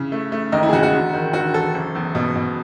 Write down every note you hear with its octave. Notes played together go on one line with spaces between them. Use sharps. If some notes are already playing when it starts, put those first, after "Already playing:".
Already playing: C#3 E4
A3
A3
D#2 D#4
E4
G#4
C#3 F#4
F#4
E1
D#3
E1 F#4
E1 A4
F#1
E2
B2
B2